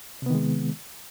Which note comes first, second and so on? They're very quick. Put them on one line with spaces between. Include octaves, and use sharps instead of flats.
C3 B3 D#3 G#3